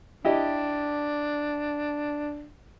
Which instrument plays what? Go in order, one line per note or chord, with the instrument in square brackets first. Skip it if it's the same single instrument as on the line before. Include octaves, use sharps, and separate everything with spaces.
[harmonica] D4 [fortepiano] E4 G4 D#5